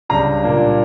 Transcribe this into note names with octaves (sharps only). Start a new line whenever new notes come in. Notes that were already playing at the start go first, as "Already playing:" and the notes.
C#2 C#3 G3 D4 A#5
A#2 G3 A#3 D4